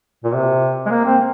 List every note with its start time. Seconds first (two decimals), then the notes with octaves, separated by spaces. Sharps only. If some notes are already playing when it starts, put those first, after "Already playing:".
0.24 A#2
0.33 C3
0.86 G#3
0.90 A#3
1.05 C4